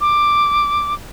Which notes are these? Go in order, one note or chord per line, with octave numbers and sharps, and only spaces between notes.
D6